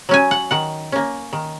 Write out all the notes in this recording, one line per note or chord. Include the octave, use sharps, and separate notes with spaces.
F#3 C#4 G#5
F#5
D#3 F#5
A#3 C#4
D#3